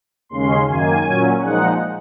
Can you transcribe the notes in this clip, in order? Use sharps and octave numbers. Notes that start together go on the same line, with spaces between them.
D#2 C#3 G#3 C#4 C6
F#2 D#3 A#3 G#5
A#2 F#3 C#4
A#2 F3 G#3 D#4 F#5